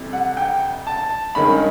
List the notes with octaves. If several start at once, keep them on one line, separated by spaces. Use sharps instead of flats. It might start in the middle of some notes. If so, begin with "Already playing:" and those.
Already playing: F2 C3 E3 G3
F#5
G5
A5
G2 D#3 G#3 C#4 B5